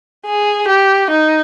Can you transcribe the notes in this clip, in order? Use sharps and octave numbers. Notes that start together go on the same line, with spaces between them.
G#4
G4
D#4